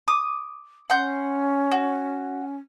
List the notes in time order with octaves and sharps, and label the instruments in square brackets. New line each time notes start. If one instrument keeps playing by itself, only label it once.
[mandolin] D6 D#6
[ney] C#4 [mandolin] F#5 C6 G6
[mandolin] F#4